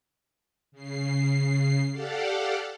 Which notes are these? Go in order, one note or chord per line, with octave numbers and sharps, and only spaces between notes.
C#3 C7
G4 A4 D5 F5 F#5